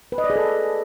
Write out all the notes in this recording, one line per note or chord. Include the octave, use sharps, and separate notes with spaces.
B4
D#5
D5
G#4
A4